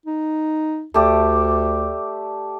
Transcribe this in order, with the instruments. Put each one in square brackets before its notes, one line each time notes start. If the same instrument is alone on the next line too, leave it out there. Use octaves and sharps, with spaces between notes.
[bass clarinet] D#4
[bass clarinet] D2 [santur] A3 G4 D5